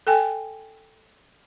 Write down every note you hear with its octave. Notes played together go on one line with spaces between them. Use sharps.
A4 G5 G#5